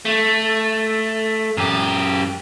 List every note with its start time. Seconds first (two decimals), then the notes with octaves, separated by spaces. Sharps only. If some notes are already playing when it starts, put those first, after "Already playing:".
0.05 A3
1.57 F#2 G4